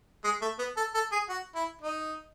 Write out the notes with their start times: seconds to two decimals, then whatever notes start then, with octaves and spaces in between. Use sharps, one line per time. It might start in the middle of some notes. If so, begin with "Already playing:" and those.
0.24 G#3
0.42 A3
0.59 B3
0.77 A4
0.94 A4
1.12 G#4
1.29 F#4
1.55 E4
1.81 D#4